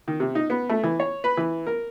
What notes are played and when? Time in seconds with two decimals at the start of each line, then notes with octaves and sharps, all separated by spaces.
0.08 D#3
0.20 C3
0.35 D#4
0.50 B3
0.69 A3
0.83 E3
1.00 C#5
1.24 B4
1.37 E3
1.67 A#4